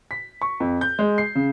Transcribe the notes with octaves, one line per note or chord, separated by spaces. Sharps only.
B6
C#6
F2
G6
G#3
C7
C#3